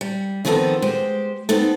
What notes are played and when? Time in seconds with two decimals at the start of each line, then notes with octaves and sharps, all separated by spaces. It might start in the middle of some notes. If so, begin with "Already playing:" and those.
0.01 G3
0.45 D#3 F3 B3 C4 G#4 A4
0.82 G#3 G4 C5
1.49 B3 C4 D#4 A4